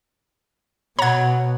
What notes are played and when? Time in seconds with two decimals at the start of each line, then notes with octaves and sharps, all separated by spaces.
0.99 B2 C#5 F#5 A#5 G#6